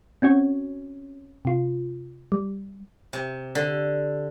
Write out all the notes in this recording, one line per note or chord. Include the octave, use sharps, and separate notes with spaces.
C4 C#4 F#4 C#5
C3 F4
G3
C3
D3